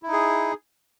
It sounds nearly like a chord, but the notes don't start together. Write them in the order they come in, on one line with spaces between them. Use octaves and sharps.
E4 D#4 G#4